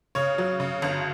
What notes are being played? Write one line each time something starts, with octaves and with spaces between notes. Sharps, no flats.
C#3 C#5
F#3
C#3
G1